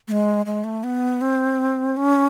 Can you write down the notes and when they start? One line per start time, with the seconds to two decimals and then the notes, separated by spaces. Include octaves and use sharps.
0.08 A3
0.12 G#3
0.46 G#3
0.64 A3
0.83 B3
1.21 C4
1.97 C#4